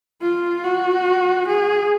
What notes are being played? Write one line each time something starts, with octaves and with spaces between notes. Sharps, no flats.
F4
F#4
G#4